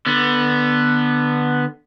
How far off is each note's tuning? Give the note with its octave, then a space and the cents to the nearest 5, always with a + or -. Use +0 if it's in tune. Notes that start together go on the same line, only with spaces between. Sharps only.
D3 +15 B3 -5